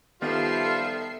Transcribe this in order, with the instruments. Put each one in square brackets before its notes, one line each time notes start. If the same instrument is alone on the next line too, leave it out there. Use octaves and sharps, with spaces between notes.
[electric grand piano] D#3 B3 [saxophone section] F3 G3 [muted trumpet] F4 [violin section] A4 E5 C7